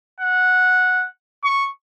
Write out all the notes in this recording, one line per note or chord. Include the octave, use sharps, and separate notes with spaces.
F#5
C#6